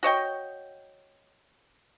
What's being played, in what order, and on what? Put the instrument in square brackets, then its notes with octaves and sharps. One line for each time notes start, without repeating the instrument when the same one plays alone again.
[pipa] F#4 C#5 D#5 G5